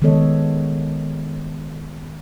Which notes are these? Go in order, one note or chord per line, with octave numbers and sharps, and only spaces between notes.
D#3 G#3 B3 A4 C#5 D#5